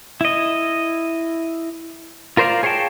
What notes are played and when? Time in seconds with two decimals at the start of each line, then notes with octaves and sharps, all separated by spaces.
0.21 E4 D#5
2.37 F4 A#4 C5 D5 F5
2.63 G#4 C#5 F5 G5 A5